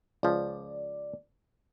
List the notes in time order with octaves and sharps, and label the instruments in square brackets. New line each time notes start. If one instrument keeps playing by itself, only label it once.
[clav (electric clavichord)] C#2 F3 [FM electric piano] D5